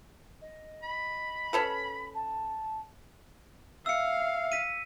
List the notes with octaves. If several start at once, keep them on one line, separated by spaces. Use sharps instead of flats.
D#5
B5
C#4 A4 B4
A5
E5 F5 E6 C#7
B6 D#7